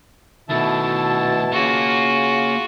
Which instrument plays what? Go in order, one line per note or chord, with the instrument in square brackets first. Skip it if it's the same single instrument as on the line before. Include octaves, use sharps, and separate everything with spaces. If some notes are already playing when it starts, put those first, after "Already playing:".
[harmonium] B2 E4 A5 [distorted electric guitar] D#3 A3
[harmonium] C#3 [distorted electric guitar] A#3 [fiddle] F4 F#4